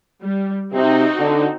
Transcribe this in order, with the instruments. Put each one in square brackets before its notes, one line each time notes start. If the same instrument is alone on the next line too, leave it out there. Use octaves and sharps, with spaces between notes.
[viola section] G3
[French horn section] C3 [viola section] C4 D#4 F#4
[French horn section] D3